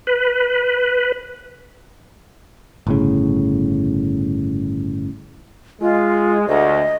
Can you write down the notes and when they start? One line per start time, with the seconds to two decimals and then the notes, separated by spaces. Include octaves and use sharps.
0.07 B4
2.87 G1 A2 C#3
5.81 G#3 F4
6.47 D2 D#5